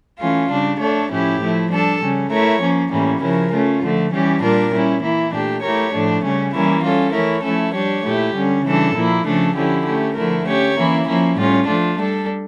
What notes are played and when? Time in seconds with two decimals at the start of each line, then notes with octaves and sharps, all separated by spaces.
0.19 E3 A3 C#4 F4
0.49 C#3 G3 D4
0.79 A3 D4 A4 C#5
1.10 A2 F3 C#4 E4 G4
1.39 F3 A3 E4
1.70 G3 D4 A4
2.01 C#3 G3 C#4
2.30 A3 E4 A#4 C#5
2.61 F3 A#3 C#4
2.90 A2 E3 G3 A#3 C#4
3.21 C#3 F3 C#4 E4 A#4
3.52 A3 C#4 F4
3.81 D3 F3 A3
4.12 E3 G3 C#4 G4
4.42 A#2 G3 D4 F4 A#4
4.72 G3 C#4 E4
5.02 E3 A#3 E4
5.33 A#2 A3 D4 G4
5.62 A3 E4 G4 A#4 C#5
5.92 A2 F3 A3 D4
6.23 C#3 G3 C#4
6.53 E3 G3 A#3 C#4 E4
6.83 G3 C#4 F4 A4
7.13 E3 A3 E4 A#4 C#5
7.44 F3 A3 C#4 E4 A4
7.73 G3 D4 G4 C#5
8.04 A#2 A3 E4 G4
8.35 D3 G3 C#4
8.64 C#3 E3 G3 D4 A4
8.95 A#2 F3 A#3 E4
9.25 C#3 F3 A3 D4 A4
9.55 D3 F3 C#4 E4 G4
9.85 A3 C#4 G4
10.15 D3 F3 A3 E4 A#4
10.45 A3 C#4 G4 C#5
10.76 E3 A#3 C#4 E4
11.06 F3 A#3 C#4 E4
11.36 A2 G3 C#4 F4
11.66 F3 A3 D4 F4
11.96 G3 D4 A4